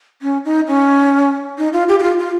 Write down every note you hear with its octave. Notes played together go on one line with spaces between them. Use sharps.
C#4
D#4
C#4
D#4
F4
G4
G4
F4
F4